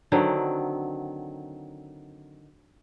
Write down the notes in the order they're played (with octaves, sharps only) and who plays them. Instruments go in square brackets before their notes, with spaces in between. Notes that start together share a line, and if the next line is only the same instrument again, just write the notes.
[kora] D3 D#3 F#3 C4